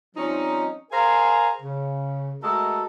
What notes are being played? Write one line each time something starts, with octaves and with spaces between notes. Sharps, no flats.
F3 G3 C4 C#4 D#4
G#4 A#4 C5 F5 G#5 A#5
C#3
G#3 A3 F#4 A4 A#4 D#5